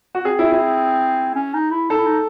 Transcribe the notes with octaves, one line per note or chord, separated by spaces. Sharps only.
F#4
C4 G#4
E4
E4
C#4
D#4
E4
D#4 A4
E4
D#4